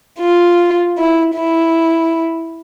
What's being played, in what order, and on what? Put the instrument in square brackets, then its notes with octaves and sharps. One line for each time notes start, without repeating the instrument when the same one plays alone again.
[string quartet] F4
E4
E4